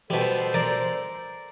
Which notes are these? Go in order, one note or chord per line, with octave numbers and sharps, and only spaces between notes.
B2 G3 D4 A4 C5
A#4 D5